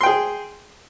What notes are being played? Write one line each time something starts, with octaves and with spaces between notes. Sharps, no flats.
G#4 G5 C6